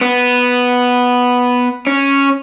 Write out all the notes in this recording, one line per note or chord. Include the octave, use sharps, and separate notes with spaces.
B3
C#4